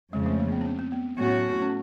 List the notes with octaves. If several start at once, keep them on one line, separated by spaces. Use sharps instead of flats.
F2 C#3 F3 G#3
A3
A#3
B3
C#4
C4
C4
B3
A2 F#3 A3 B3 C#4 F#4
C#4